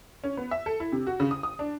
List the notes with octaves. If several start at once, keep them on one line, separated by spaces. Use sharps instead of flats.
C#4
B3
E5
A4
E4
C3
F#4
C#3
D#6
D#6
D4